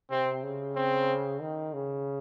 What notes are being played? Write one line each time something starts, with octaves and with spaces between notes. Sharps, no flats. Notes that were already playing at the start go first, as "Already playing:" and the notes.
C3 C4
C#3
C4
D#3
C#3